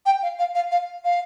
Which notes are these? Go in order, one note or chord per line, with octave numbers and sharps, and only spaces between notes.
G5
F5
F5
F5
F5
F5